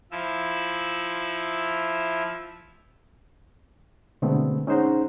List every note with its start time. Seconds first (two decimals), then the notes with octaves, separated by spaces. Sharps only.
0.11 F3 E4 E6
4.22 B2 D3 G#3 A3 B3 C4
4.67 C#4 D#4 G#4 C5 F#5 A#5